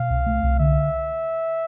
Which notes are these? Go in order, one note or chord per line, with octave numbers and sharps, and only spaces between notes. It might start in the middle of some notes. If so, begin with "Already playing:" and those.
Already playing: B2 F5
C2
A3
C2
D3 E5